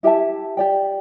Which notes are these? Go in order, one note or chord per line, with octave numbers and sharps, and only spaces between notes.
E4 G4 E5 A5
G4 D5 G5